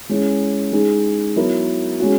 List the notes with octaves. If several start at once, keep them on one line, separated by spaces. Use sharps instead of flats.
G#3 C#4 E4
G#3 D#4 G#4
F#3 B3 E4 A#4
G#3 C#4 F#4